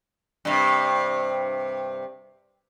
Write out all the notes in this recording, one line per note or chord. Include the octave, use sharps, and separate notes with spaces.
G2 C3